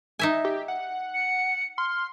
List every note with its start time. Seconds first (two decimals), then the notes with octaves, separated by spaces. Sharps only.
0.19 D#4 E5 G#5
0.45 G4
0.68 F#5
1.14 C#7
1.78 C6 F6